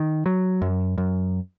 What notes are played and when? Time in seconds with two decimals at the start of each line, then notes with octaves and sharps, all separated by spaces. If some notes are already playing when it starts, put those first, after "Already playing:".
Already playing: D#3
0.26 F#3
0.62 F#2
0.98 F#2